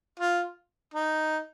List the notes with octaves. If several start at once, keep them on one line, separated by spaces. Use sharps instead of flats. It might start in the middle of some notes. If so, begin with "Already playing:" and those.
F4
D#4